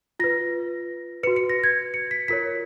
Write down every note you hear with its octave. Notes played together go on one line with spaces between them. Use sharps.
F4 B4 A#6
F#4 B4 C#7
C#7
A#6
G#6
C#7
B6
F4 A#4 C#5 B6